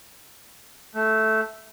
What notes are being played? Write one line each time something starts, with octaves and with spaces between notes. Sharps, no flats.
A3